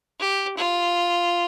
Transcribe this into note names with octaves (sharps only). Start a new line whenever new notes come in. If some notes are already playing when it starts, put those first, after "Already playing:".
G4
F4